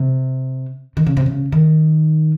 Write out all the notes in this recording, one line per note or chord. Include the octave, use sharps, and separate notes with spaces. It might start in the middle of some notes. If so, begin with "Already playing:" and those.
Already playing: C3
D#3
C#3
C3
C#3
D#3